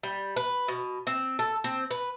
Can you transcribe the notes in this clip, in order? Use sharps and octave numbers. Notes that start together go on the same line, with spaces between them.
G3
B4
B2
C4
A4
C4
B4